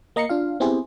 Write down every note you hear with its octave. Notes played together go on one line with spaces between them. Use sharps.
A#3 D#5 A#5 C7 C#7
D4 F4 F5
B3 C4 E4 G4 G#4 C5